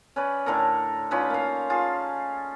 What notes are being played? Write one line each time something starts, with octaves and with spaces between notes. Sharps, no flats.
C#4 B4 D5
A2 D3 A4 A#4
C#4 D#4 F4 B4
A#3 F5
F4 G#4 A5